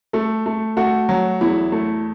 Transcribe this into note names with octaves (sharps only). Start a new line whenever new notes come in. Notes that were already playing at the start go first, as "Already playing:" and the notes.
A3 A4
A3
A3 F#4
F#3
E2 E4
A3